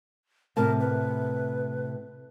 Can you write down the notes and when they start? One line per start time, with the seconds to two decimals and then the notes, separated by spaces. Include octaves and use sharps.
0.57 A2 C3 A#4 A5
0.80 B4